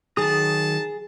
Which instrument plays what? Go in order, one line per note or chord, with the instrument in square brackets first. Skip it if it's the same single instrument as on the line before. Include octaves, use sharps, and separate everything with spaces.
[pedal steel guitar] D#3 F#3 D#6 [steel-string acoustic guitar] G#4 [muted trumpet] A5